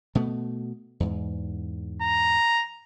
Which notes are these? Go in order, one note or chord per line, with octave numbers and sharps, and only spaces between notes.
B2 A3 B3
E2 G#2
A#5